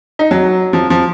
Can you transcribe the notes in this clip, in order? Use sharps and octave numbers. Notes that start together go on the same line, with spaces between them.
D#4
F#3
F3
F3